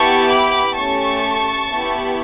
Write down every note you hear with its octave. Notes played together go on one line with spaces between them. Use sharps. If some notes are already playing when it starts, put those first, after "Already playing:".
Already playing: B3 E4 G4 A5 C#6
B5 D6
A3 C#4 G4 A5 C#6
B3 E4 G4